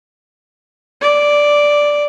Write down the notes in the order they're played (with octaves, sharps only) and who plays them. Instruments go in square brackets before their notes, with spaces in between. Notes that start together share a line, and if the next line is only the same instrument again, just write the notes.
[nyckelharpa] D5